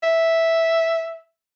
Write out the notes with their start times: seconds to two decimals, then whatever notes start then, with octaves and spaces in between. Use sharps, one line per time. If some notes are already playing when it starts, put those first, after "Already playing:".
0.03 E5